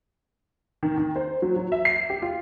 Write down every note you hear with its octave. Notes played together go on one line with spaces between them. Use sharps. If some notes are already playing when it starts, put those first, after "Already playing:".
D#3
D#3
C5
F#3
F#3
E5
C7
G4
F4